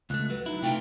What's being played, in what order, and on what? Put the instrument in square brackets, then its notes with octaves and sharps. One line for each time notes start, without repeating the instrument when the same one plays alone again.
[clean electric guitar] C#2 A3 [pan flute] F#6
[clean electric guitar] F#3 [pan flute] B4
[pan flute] D#4 [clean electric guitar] E4
[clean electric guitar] C3 A3 F4 [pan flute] G5